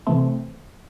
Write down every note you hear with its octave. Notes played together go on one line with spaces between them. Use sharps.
C3 E3 A3 C4